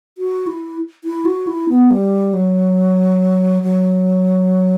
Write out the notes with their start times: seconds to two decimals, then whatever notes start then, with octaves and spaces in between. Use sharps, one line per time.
0.18 F#4
0.47 E4
1.04 E4
1.25 F#4
1.47 E4
1.69 B3
1.91 G3
2.33 F#3
3.63 F#3